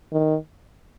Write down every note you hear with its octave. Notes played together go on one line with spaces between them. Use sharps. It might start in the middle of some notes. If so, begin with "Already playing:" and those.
D#3